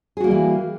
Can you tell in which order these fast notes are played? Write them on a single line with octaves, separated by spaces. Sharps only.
G#4 F#4 A#3 G3 E3